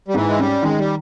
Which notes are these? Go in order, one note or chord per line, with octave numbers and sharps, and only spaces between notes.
G3
G#2 E3
G#3
G3 C#4
D#3 G#3
G3